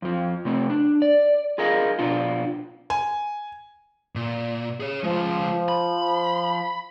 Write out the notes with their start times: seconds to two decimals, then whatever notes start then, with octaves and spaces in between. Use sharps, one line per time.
0.02 F2 F3
0.45 C3 A3 C4
0.70 D4
1.02 D5
1.58 F4 G#4 A#4 D#5 F5
1.99 B2 D4 F4
2.90 G#5
4.15 A#2
4.80 G#4 C#5
5.04 F3 G#3 F4
5.68 B5